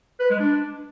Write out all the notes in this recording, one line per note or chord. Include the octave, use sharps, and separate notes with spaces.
B4
G#3
D4